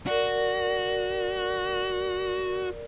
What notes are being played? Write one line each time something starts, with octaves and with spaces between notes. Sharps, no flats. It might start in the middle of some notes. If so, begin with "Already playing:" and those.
F#4 A#4 D5